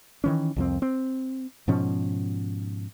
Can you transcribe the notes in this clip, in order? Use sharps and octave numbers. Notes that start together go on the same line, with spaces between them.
D#3 E3 C#4
C2 F2 C4
C4
G#2 B2 F3 C#4